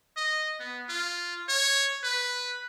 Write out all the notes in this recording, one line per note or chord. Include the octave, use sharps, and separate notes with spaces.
D#5
B3
F4
C#5
B4